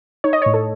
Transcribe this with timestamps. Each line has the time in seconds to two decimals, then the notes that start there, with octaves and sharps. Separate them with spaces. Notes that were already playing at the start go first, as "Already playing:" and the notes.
0.24 D#4 C#5
0.33 D#5
0.42 A2 C#5
0.54 A4